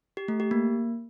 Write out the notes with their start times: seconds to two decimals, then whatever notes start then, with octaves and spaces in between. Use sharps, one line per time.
0.17 G4
0.28 A3
0.40 G4
0.51 A#3